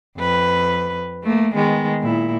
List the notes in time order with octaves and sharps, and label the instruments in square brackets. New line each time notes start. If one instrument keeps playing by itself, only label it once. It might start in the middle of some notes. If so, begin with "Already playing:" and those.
[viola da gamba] F2 B4
A3 A#3
D#3 G#3 B3
A#2 E4